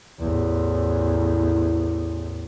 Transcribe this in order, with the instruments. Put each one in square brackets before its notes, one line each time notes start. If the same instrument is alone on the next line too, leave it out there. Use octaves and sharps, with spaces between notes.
[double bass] A1 E2